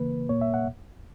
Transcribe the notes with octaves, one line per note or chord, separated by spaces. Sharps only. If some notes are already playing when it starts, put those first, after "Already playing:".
Already playing: C#3 E3 A#3 B4
A#2 A#3 C#5
E5
F#5